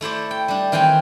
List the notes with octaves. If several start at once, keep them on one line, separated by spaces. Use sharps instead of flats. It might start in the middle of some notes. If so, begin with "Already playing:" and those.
A3 E4 C5 D5
G5
G3 D4
D#3 E3 C4 G5 G#5